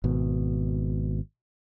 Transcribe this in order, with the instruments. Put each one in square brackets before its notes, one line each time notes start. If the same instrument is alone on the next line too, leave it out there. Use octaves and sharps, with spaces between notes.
[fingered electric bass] G#1 B2